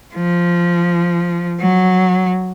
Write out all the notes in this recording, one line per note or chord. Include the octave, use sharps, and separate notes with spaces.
F3
F#3